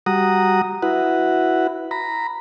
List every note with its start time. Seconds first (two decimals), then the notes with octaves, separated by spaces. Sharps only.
0.06 G3 F#4 F#5 A#5 D#6
0.82 E4 F#4 B4 F#5
1.91 A#5 B5